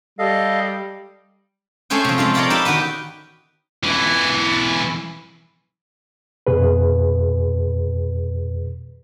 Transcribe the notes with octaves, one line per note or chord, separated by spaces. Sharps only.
G3 A4 D#5 F5
A3 C#4 G#4 C5 G5
C3 F3
G#3 A3 F4
A#4 C#5 D5 F5 G5 A#5
D#4 G4 E5 G5 A5 B5
D#3 B3 F#4 G4 B4
B1 E3
F2 B2 G#4 B4